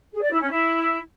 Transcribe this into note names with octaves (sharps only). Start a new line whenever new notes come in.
G#4
D5
E4
C#4
E4